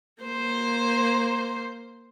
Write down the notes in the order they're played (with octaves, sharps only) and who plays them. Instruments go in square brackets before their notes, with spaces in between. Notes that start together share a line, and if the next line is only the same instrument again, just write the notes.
[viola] A#3 C5